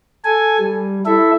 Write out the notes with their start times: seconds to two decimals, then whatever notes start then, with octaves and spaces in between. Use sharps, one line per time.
0.25 A4 G#5
0.59 G3
1.06 E4 A4 E5